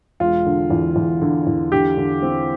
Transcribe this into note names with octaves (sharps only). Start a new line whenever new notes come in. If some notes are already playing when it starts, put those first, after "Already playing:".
E1 F4
D3
E2
E2
D3
E2
D3 G4
D3
C4